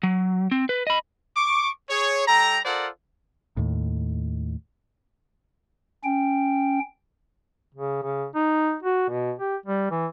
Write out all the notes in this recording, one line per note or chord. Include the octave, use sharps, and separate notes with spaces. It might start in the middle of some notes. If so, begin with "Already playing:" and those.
F#3
C4
B4
D#5 B5
C#6 D6
G#4 C#5
G3 A4 G5 A#5
F4 A4 A#4 C5 D5 F#5
D#2 A2
C#4 G5
C#3
C#3
D#4
F#4
B2
G4
G3
E3